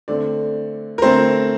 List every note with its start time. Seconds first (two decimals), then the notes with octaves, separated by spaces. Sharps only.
0.08 D3 A3 C4 D5
0.98 A#4
1.02 D3 A3 C4 C5